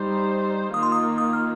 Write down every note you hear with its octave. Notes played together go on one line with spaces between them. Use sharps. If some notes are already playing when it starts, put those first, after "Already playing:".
Already playing: G3 D#4 C5
D#3 A#3 F4 D#6
C6
D#6
D#6
F6